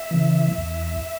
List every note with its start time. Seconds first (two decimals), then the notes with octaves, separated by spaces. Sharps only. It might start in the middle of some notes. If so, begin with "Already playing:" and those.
Already playing: E5
0.11 C#3 E3
0.58 E2